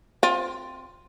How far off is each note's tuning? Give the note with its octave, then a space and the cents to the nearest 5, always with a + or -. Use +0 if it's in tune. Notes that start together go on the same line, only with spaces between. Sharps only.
C4 +0 F4 +25